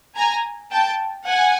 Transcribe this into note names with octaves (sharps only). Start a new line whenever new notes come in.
G#5 A#5
G5 A5
F#5 G#5